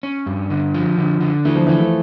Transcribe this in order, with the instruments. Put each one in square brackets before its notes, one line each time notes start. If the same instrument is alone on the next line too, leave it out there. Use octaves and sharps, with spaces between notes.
[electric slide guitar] C#4
G2
D3
F3
D3
D3
[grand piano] E3 [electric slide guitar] A3
[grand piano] F3
[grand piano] E3 [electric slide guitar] A3
[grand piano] F3